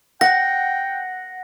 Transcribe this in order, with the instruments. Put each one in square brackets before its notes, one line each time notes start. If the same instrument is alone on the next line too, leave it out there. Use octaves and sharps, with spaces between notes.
[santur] F#5 [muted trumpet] G5 [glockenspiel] A#6